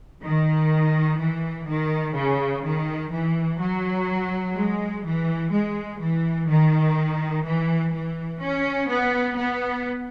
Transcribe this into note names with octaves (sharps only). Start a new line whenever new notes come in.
D#3
E3
D#3
C#3
D#3
E3
F#3
G#3
E3
G#3
E3
D#3
E3
E3
C#4
B3
B3